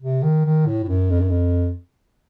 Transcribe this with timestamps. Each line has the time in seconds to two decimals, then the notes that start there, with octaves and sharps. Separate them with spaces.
0.02 C3
0.23 D#3
0.45 D#3
0.67 A2
0.84 A2
0.89 F#2
1.10 F2
1.20 F#2
1.30 F2